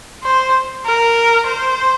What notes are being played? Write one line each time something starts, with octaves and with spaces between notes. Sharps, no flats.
C5
A#4
C5